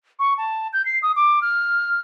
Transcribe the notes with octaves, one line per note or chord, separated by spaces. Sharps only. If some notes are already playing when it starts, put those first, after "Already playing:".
C#6
A5
G6
C7
D#6
D6
F6